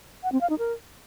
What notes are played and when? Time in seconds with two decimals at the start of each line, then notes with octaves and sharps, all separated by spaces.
0.23 F#5
0.32 C4
0.41 F5
0.50 D#4
0.58 A#4